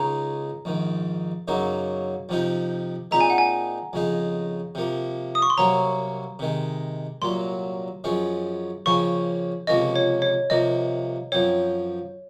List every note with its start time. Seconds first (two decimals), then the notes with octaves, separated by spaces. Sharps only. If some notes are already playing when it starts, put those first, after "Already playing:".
Already playing: C#2 C#3 G#3 D#4 A#5
0.65 A#1 G#2 D#3
1.48 F#2 C#3 F#3 A#3 D#4
2.29 F2 C3 F3 C4 D#4
3.11 A#2 G#3 C4 D#4 A#5
3.21 G#5
3.30 F#5
3.38 G#5
3.93 F2 C#3 G#3 D#4
4.75 C3 F3 A#3
5.35 D#6
5.42 C#6
5.50 C6
5.58 C2 C3 F#3 A#3 C#4 A#5
6.39 C3 D#3 G#3
7.22 C2 A#2 F#3 C6
8.04 F#2 F3 G#3 C#4
8.86 F2 C#3 F3 A#3 C#4 C#6
9.67 C#2 C3 F3 A#3 C#4 D#5
9.96 C#5
10.22 C#5
10.50 C2 C3 F3 A#3 D#5
11.32 F#2 F3 C4 C#5